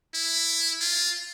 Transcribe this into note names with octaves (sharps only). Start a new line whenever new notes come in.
E4
F4